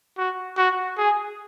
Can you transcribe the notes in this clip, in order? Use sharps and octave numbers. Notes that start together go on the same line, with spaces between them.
F#4
F#4
G#4